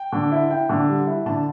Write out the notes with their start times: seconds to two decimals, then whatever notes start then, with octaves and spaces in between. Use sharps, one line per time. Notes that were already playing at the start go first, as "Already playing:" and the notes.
Already playing: G5
0.12 D3
0.32 E4
0.50 E4 G5
0.69 D3
0.88 G3
1.07 E4
1.26 D3 A5